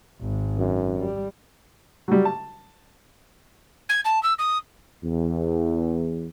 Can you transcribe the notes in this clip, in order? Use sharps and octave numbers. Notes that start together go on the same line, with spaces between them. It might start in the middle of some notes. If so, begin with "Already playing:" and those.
G#1 G#2
F#2
G3
F#3 G3
A5
G#6
A5
E6
D#6
E2